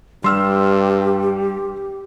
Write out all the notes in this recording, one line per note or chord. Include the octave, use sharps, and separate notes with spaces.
G2 G3 G4 C6 E6 F6